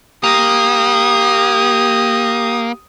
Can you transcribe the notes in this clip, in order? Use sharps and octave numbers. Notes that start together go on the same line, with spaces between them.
A#3 G4 D#6